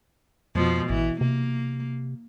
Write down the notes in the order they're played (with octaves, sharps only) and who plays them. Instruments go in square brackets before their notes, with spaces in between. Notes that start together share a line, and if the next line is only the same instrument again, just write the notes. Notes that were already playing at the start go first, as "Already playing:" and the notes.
[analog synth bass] F2 [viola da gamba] B2 F3
[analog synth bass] A1 [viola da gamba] E3
[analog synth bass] C3 [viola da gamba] A#3